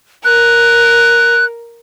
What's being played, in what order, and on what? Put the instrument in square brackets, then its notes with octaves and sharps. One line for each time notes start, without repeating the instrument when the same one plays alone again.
[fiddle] A#4 [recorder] F#6